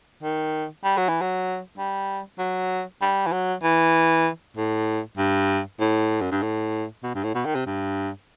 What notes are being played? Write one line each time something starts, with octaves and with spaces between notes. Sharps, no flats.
D#3
G3
F#3
E3
F#3
G3
F#3
G3
E3
F#3
E3
A2
G2
A2
F#2
G2
A2
B2
G2
A2
B2
D#3
C3
G2